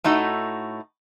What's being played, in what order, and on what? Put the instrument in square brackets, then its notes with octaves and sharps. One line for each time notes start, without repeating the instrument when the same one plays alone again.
[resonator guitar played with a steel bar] A2 A3 D#4 F#4